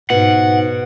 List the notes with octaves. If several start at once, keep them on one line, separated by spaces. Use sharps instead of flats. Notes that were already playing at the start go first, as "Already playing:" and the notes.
G#2 B2 F#5